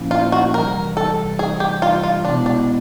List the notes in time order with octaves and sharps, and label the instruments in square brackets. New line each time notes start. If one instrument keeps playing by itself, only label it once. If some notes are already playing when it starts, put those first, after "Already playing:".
Already playing: [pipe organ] A#2 F3 A#3 C#4 E4
[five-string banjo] F4
F#4
[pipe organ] C3 E3 G3 [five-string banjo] A#4
[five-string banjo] A4
G#4
G4
F4
F4
[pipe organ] B2 G#3 B3 E4 [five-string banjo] D4
[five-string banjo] D4